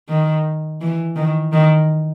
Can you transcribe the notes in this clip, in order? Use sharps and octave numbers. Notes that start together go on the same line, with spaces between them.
D#3
E3
D#3
D#3